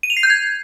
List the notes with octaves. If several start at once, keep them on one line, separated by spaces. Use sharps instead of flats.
D#7
F7
C7
G6
G#6